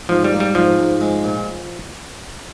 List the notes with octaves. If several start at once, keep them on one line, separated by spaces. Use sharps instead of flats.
G#2 F3
G3
A#3
G3
G#2 F3
G#2
G#3
A#2